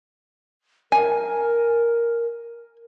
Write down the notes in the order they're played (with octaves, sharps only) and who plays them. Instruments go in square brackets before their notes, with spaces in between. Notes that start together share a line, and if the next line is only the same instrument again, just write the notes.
[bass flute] A#4 [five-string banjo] G#5